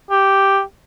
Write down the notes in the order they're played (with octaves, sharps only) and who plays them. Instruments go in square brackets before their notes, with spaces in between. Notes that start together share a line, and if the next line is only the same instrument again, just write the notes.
[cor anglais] G4